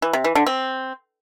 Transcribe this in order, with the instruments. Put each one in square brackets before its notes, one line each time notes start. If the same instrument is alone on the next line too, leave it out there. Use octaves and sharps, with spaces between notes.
[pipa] E3
C3
E3
D3
C4